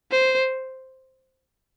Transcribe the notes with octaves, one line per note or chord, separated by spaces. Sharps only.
C5